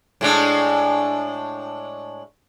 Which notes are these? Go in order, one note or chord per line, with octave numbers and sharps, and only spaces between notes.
A2 G#3 D4